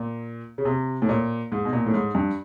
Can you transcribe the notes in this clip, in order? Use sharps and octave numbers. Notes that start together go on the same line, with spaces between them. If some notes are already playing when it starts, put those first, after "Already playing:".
Already playing: A#2
C#3
C3
A2
A#2
G#2
B2
A#2
A2
G#2
G2